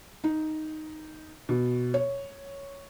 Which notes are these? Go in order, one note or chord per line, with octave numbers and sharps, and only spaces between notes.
D#4
B2
C#5